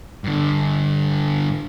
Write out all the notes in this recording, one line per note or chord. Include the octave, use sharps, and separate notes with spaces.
G2 D3